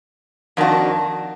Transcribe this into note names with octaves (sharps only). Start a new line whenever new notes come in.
F2 D#3 A#3 D4 F#4